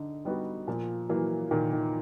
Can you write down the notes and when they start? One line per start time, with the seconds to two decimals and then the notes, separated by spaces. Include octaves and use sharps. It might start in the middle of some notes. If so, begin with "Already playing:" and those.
Already playing: D3 D#4
0.25 G3 B3 D#4 F#4
0.67 A#2 F3
1.09 E3 F#3 A#3
1.51 A#2 D#3
1.72 D#3